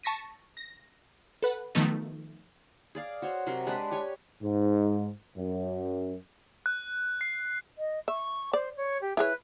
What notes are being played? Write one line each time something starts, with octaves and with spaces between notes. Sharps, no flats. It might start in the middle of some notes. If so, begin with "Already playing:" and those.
A5 C#6 A#6 B6 D#7
A#6
A4 B4 F#5
D#3 F3 F#3 A3 B3 D#4
G#4 D5 F5
F#4 C5 C#5
C3 F#3 A#4 C6
G#3 D4 G4 B4
G4 C#5 G#5
G#2
F#2
F#6
C7
D#5
E5 C#6
C5 D5
C#5
G4
E4 G#4 B4 C#5